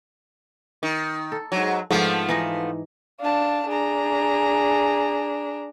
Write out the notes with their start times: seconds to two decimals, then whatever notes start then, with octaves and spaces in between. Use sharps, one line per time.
0.83 D#3
1.32 A4
1.52 G#2 F#3
1.91 G#2 F3 A3 B3 D4 F4
2.29 E3 D#4 D#5
3.20 D4 F5 A5
3.69 D4 G#4 A#5